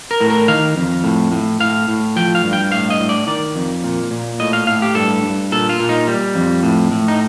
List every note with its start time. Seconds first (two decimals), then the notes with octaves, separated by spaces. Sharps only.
0.11 A#4
0.20 A2
0.30 A#4
0.48 D#3 F5
0.77 F2
1.04 A2
1.32 A2
1.60 A2 F5
1.89 A2
2.16 F3 G5
2.35 F5
2.44 G2
2.53 G5
2.72 A2 F5
2.90 D#5
3.00 A2
3.09 D5
3.27 D#3 D5
3.56 F2
3.84 A#2
4.11 A#2
4.40 A2 D#5
4.53 F5
4.67 A2 F5
4.82 G4
4.95 G2 A4
5.23 G2
5.52 A#2 A4
5.69 F4
5.79 A#2
5.89 D#4
6.07 G3
6.35 F2
6.63 A2
6.91 A2
7.08 D#4